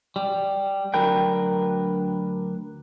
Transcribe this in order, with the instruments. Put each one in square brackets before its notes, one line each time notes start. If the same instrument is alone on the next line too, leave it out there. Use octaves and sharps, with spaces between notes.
[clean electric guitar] G3
D2 F#3 D4 A#4 B4 G5